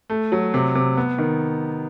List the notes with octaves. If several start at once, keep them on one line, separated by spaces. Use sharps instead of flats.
A3
F#3
C3
C3
B3
D#3